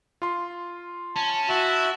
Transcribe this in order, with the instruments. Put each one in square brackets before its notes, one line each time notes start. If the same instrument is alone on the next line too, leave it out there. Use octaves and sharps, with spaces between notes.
[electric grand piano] F4 C6
[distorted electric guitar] C#4 [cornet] A5
[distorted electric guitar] E4 [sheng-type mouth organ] F#4 E5